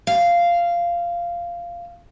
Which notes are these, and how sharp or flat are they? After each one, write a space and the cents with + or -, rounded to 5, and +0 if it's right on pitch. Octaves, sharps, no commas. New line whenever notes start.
F5 -10